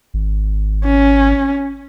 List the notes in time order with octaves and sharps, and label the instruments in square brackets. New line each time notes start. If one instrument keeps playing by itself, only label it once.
[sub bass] G#1
[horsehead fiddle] C#4